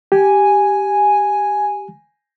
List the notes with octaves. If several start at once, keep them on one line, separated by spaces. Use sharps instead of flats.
G4 G#5